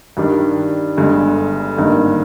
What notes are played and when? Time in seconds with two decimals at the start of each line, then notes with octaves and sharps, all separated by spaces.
0.17 G2 D#3 G3 D4
0.97 G1 G2 D3 G#3
1.78 G#1 G2 D#3 A#3 D#4